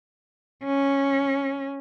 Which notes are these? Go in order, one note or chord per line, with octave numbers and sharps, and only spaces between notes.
C#4